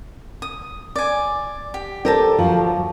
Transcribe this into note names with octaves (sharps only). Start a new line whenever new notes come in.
D#6
D5 G#5
G4
G4 A4 A#4 C5 D5 A5
D2 F3 F#3